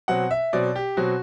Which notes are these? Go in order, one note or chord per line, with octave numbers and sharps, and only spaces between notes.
B2 F#3 C4 F#5
E5
B2 F#3 C4 D5
G4
B2 F#3 C4 F#4